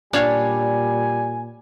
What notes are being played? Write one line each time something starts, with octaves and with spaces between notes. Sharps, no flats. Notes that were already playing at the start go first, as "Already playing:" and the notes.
A#2 G3 D4 C#5 F5 G#5